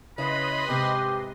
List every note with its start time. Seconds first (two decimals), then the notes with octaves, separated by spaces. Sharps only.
0.18 C#3 C#4 E4 B4 D#5 B5 C6
0.69 G#2 C3 G4